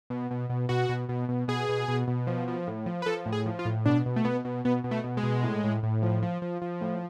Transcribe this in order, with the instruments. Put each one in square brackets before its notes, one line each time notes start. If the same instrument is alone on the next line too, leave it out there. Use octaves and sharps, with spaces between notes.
[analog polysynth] B2
B2
B2
B2 F#4
B2
B2
B2
B2 G#4
B2
B2
B2
F3
F3
A2
F3
B4
F3 A4
A2
G#4
F3
F4
A2
B2 D4
B2
A3
B2 B3
B2
B2 B3
B2
A3
B2
G#3
B2
A2
A2
A2
F3
F3
F3
F3
A2